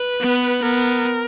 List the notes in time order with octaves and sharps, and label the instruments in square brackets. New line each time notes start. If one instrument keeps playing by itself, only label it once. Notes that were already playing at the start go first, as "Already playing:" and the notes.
Already playing: [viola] B4
[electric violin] B3
[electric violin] B3 [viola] A#4